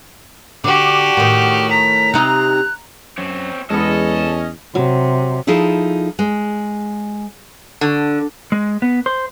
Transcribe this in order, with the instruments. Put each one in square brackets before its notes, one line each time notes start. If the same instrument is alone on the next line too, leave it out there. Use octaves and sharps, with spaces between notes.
[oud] D3 [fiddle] F#4 G4 [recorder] D6
[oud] A2 D#3 [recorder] F#5
[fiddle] A#5 [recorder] B6
[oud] C3 D#4 [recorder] F#6
[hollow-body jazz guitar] F#2 [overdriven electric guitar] C4 C#5
[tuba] E2 [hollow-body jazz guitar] G#3 B3 [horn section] C#4 D#5 [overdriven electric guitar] A4
[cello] C3 [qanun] F#3
[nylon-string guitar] F3 D#4 E4 G#4 A4
G#3
[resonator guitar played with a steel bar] D3
[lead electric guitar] G#3
B3
C5